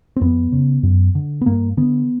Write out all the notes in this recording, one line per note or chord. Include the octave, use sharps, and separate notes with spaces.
C4
F2 B3
C#3
F#2
D3
B3
G2 A#3
D3 B3